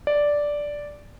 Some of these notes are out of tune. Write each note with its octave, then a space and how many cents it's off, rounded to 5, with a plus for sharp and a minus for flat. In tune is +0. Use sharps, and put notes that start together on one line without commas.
D5 -5